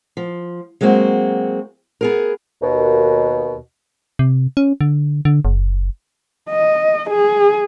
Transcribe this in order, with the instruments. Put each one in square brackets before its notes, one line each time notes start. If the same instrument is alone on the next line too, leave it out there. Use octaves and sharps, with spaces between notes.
[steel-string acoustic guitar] F3
F#3 G#3 A#3 C4 F#4
B3 G#4 A#4
[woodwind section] D#2 B2
[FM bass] C3
C#4
D3
D3
F#1
[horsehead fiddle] D#5
G#4